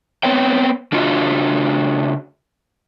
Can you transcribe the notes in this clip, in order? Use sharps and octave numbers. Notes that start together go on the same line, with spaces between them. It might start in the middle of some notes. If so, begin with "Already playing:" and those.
B3 C4 B4 C#5 G5
C#3 D4 F4 F#4 D#5